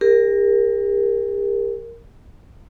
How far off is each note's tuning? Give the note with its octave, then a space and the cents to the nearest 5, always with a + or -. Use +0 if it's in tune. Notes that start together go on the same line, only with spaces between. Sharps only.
G4 +45 A#4 +0